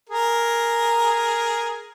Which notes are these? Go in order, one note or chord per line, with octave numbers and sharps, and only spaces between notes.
G#4 A#4